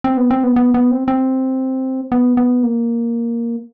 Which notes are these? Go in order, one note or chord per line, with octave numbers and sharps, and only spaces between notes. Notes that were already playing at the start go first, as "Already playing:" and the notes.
C4
B3
C4
B3
B3
B3
C4
C4
B3
B3
A#3